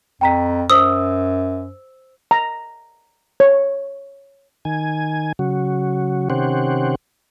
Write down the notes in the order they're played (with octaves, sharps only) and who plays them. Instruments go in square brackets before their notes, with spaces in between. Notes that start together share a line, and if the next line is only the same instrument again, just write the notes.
[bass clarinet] F2 [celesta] G5 A#5 B6
[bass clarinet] F#2 [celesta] C5 E6 [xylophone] D#6
[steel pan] A#5
C#5
[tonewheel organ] D#3 G#5
C#3 F#3 F#4
C3 D#3 C#4 G4 C5 F#5